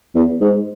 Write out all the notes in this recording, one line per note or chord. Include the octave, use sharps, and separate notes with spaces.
E2
G#2